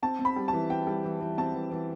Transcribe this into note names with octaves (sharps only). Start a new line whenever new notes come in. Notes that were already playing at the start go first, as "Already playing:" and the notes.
C4 A5
C4
B5
G3
A5
E3
C4 G5
G3
E3
E3
C4 A5
E3
E3